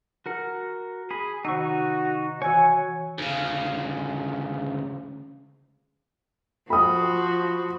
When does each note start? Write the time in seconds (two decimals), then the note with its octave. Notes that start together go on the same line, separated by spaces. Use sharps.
0.26 F#4 A#4 F#5
1.11 G#4 B5
1.45 C3 D#3 D#4 F#4 C#6 E6
2.42 E3 F#4 C#5 F#5 G#5 E6
3.18 D2 C#3
6.70 F3 F#4 B5 D#6